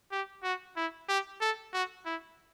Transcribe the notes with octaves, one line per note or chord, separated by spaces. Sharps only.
G4
F#4
E4
G4
A4
F#4
E4